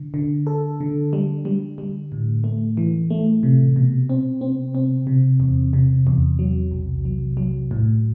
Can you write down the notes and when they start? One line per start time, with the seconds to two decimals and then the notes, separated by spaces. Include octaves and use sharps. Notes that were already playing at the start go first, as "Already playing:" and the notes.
Already playing: D3
0.14 D3
0.47 A4
0.81 D3
1.13 G3
1.45 G3
1.78 G3
2.12 A2
2.44 A3
2.77 E3
3.10 A3
3.43 C3
3.76 B2
4.09 C4
4.41 C4
4.75 C4
5.07 C3
5.40 E2
5.73 C3
6.07 E2
6.39 F#3
6.71 B1
7.05 F#3
7.37 F#3
7.71 A2